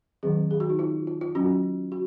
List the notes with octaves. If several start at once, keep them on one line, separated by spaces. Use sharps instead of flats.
D#3 F#3 C4 G#4
G#4
F#4
D#4
F4
F4
F4
F#3 C#4 F#4
F#4